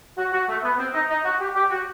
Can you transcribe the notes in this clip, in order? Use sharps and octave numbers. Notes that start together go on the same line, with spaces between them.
F#4
F#4
A3
B3
C4
D#4
D#4
F#4
G4
G4
F#4